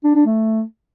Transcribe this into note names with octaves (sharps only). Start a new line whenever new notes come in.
D4
D4
A3